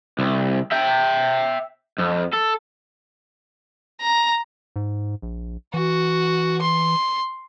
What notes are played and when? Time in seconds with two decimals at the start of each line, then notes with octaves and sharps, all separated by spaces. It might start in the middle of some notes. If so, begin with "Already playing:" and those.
0.19 C2
0.72 E5 G5
1.99 F2
2.33 A4
4.01 A#5
4.76 G#2
5.22 A#1
5.74 E3 F#4
6.61 C6